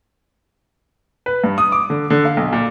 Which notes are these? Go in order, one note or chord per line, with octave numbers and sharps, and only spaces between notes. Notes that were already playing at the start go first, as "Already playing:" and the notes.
B4
G2
D#6
D6
D3
D3
F5
B1
A#2